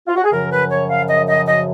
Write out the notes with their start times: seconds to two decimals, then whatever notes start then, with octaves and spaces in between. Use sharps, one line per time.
0.08 F4
0.16 F#4
0.24 G#4
0.32 F#2 C#3 F3 A#4
0.51 B4
0.70 C#5
0.89 F5
1.09 D#5
1.28 D#5
1.47 D#5